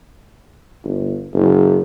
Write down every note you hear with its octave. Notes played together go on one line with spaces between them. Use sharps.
G1
F#1